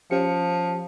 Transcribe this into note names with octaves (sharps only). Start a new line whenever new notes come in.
F3 C#4 G4 C#7